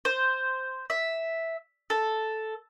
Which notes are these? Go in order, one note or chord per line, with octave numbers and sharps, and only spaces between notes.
C5
E5
A4